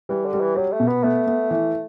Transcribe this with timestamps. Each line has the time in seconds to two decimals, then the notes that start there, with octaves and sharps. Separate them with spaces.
0.09 E3 G3
0.26 D3
0.33 G3
0.41 E3
0.57 F#3 G4
0.73 A3
0.80 B2
0.88 B3
1.04 A3 B3
1.27 B3
1.51 E3